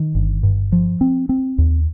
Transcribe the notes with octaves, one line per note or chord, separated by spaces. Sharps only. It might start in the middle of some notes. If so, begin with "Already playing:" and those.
Already playing: D#3
G1
G2
F3
C4
C4
D#2